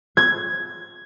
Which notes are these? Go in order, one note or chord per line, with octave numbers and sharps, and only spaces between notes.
G#6